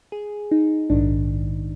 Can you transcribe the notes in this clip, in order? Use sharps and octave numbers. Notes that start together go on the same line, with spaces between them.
G#4
D#4
A#1 G#2 D#3 D4